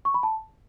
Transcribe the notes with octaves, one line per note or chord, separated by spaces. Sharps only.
C#6
B5
A5